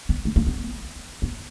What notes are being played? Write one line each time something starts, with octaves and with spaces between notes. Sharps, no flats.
B3
A3
A#3
B3
B3